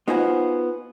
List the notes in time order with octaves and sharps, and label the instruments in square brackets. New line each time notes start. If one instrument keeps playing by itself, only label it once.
[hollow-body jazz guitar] B3 D#4 F4 F#4 C5 G#5